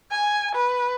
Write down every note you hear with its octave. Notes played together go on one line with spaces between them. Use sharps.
G#5
B4